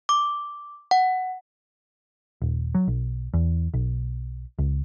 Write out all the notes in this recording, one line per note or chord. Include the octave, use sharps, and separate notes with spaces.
D6
F#5
D#1
F#3
B1
E2
B1
C#2